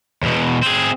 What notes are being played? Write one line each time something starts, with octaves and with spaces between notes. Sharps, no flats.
E2 B2
C4 G#4